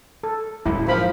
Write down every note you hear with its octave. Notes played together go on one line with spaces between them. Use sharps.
A4
D1 F#2 G#3 E4
D#3 F3 B5